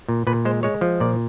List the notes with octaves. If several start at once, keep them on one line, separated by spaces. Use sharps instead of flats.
A#2
A#2 B4
G#3 C5
G#3 C#5
F3
A#2 D5